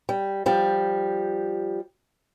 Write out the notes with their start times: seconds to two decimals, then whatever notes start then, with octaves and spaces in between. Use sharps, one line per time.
0.09 G3
0.46 F3 G3